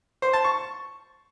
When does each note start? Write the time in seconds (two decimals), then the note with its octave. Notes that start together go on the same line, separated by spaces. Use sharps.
0.22 C5
0.33 A5
0.44 C#6